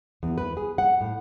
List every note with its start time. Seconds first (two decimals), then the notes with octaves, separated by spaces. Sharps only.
0.23 E2
0.38 B4
0.57 G#4
0.78 F#5
1.01 A2